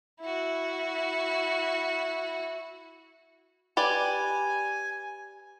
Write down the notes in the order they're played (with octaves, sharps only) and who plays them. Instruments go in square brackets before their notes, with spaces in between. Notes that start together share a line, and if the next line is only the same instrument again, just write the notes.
[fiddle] E4 F#4
[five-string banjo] G4 B4 D5 [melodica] G#5